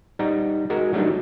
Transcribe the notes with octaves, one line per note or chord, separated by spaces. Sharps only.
G3 D#4 F#5 A#5
G#3 F#4 A#4
F#3 G3 A3 D4 D#4